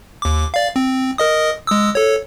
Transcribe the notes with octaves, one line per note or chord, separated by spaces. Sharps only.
D#2 D6
D5 F5
C4
A#4 D#5 D#6
G#3 D#6 E6
A4 C#5